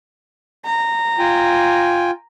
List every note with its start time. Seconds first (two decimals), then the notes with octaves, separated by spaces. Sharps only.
0.66 A#5
1.19 F4 G5 G#5